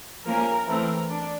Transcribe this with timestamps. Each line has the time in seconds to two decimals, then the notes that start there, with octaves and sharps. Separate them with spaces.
0.24 F3 A#3 C#4 A#4
0.67 E3 A3 C4 A#4
1.09 D4